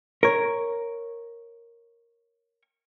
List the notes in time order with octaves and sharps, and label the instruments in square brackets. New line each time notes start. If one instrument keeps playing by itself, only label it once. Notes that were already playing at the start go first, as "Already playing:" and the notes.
[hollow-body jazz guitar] A#4 C#5